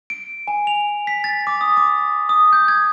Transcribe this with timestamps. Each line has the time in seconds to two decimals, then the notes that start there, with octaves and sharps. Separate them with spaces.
0.10 D7
0.48 G#5
0.67 F7
1.07 B6
1.24 A6
1.47 D6
1.61 D#6
1.77 D6
2.29 D#6
2.53 G6
2.68 G#6